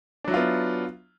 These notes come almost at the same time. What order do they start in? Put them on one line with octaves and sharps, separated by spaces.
D4 F#3 E4 F4 B3